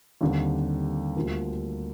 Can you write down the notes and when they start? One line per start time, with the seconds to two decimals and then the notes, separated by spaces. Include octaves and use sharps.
0.21 D#2 D3 G3 C4
1.16 D2 D3 G3 A#3 F4